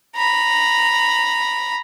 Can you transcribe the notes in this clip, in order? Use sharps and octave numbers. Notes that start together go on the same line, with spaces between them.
A#5 B5